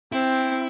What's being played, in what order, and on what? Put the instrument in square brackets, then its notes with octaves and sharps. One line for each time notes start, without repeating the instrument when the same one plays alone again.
[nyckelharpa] C4 [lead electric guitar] E4